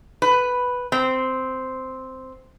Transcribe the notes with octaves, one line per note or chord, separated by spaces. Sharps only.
B4
C4